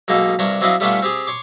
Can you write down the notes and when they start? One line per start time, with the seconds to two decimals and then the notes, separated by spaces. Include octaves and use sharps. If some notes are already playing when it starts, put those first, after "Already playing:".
0.08 B1 B2 G#3 A#3 D#4 A4
0.39 C2 G2 D4 C#5 G5 A#5
0.61 F#3 C4 D4 E4 D#5 F5
0.80 G3 A3 B3 C#4 D4 F4
1.02 C4 G4 G#4
1.27 C#5 C6 D6